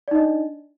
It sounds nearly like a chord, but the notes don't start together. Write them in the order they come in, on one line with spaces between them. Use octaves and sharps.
D5 D#4 D#5 D4